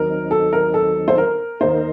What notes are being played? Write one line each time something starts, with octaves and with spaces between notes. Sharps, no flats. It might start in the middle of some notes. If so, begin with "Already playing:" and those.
Already playing: D#2 D#3 F#3 C4 D#4 A#4
A4
A#4
A4
C5
A#4
D#2 D#3 A#3 D#4 A#4 C5